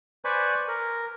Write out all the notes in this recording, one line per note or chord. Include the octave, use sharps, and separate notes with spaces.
B4 C5 D5 G#5 B5 C#6
A#4